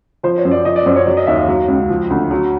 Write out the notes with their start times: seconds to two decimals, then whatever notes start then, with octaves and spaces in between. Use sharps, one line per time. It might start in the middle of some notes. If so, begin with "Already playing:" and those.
0.23 F3 C5
0.37 C#5
0.45 F#2
0.51 D5
0.65 F3 D#5
0.76 D5
0.86 F#2 C5
0.96 C#5
1.06 F#3 D5
1.17 D#5
1.27 D#2 E5
1.37 F5
1.48 F#3
1.68 C#2
1.89 F3
2.10 D2
2.31 F#3